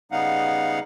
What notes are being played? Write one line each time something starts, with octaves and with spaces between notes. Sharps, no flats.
C#3 G3 B3 D#4 F5 F#5